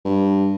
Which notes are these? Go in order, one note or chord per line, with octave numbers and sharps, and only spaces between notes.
G2